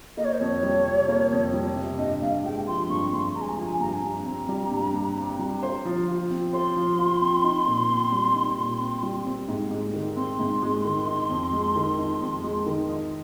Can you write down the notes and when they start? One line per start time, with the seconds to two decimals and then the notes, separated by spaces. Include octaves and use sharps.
0.17 A#3 D#5
0.25 C#5
0.33 C5
0.40 F2 C#5
0.63 G3
0.85 C3
1.08 A#3
1.31 F2
1.53 G3
1.76 C3
1.99 G2 D#5
2.22 G2 F5
2.44 G#3 G5
2.67 F3 C6
2.90 G2 C#6
3.12 G2 C6
3.35 G#3 A#5
3.42 G#5
3.49 A#5
3.58 F3 G#5
3.80 G2 A#5
3.93 G#5
4.03 G2 A#5
4.26 C4
4.49 G3
4.71 G2
4.94 G2
5.16 C4
5.39 G3
5.63 C5
5.85 F3
6.08 F4
6.30 C4
6.53 C5 C6
6.76 F3
6.99 F4
7.21 C4
7.44 D#4
7.66 A#2
7.89 C4
8.12 G3
8.35 D#4
8.58 A#2
8.80 C4
9.03 G3
9.26 C4
9.48 G#2
9.71 G#3
9.93 D#3
10.16 C4 C6
10.39 G#2
10.63 G#3
10.84 D#3
11.07 D#4
11.30 F2
11.53 G#3
11.76 D#3
11.98 D#4
12.21 F2
12.43 G#3
12.66 D#3
12.89 D#5